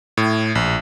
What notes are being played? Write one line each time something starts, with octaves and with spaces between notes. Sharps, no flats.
A2
A#1